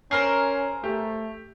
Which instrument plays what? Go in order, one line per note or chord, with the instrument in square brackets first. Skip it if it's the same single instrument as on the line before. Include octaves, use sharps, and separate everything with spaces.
[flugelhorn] C#4 [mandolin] G#4 A#4 C5 [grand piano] C7
[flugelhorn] A3 [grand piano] G4